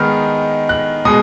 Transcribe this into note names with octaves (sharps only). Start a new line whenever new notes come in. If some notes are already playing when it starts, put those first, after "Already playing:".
Already playing: D#3 G#3 B3 D#4 F6
F#6
B2 G#3 D#6